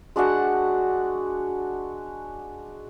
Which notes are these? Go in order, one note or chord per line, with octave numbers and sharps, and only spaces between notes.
G#3 D4 F#4 F#5